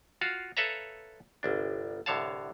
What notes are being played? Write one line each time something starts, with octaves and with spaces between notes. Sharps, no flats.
F4 F#4 F5
A4 B4 C#5 E5 F5 A#5
G1 C2 D4
C2 A2 D3 C#5 F5 A5